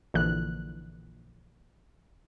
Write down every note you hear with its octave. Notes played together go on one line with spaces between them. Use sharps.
A#1 D3 E3 F#6